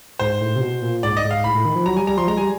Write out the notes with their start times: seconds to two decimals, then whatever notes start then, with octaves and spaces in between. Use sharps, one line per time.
0.19 G#2 C5
0.41 A2
0.56 C3
0.61 B2
0.81 A#2
1.03 G#2 D5
1.17 D#5
1.24 G#2
1.31 F5
1.44 A2 B5
1.55 A2
1.65 D#3
1.75 F3
1.86 F#3 A#5
1.96 G3 G#5
2.07 G3 A#5
2.18 F3 C6
2.28 G#3 A#5
2.37 G3 G#5